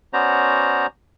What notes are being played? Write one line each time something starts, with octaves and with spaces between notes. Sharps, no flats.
B3 C#4 F#4 C5 D5 A#5